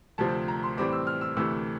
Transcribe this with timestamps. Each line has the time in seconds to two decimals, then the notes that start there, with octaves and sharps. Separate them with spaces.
0.18 D2 C3 F3 C4 A5
0.48 A#5
0.63 C6
0.77 A2 E3 G3 C4 D6
0.93 E6
1.07 F6
1.21 E6
1.37 D2 C3 E3 A3 E6